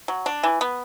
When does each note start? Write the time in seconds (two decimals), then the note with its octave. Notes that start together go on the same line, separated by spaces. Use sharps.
0.08 F#3
0.26 D4
0.43 E3
0.61 B3